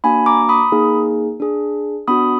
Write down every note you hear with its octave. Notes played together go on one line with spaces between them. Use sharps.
A#3 D4 F#4 G#5 B5
A#5 D6
B5 D#6
A#3 D#4 G#4
D4 G#4
B3 D4 F#4 B5 D#6